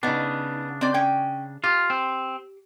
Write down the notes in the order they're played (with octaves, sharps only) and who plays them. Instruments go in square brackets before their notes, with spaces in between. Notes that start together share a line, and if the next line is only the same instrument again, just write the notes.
[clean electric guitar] C#3 D4 [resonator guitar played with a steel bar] B3 D#4
[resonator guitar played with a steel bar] C4 D5
C#4 G5
[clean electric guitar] F4 [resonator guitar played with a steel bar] G4
[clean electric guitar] C4